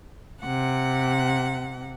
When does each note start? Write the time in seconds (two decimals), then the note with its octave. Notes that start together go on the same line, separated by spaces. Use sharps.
0.40 C3 F#5